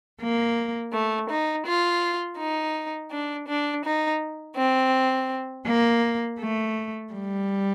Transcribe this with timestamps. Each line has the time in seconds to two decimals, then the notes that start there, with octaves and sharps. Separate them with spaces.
0.20 A#3
0.93 A3
1.29 D#4
1.66 F4
2.38 D#4
3.12 D4
3.48 D4
3.84 D#4
4.56 C4
5.65 A#3
6.38 A3
7.11 G3